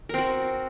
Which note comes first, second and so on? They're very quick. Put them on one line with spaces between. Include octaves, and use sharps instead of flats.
A#4 C4 F#4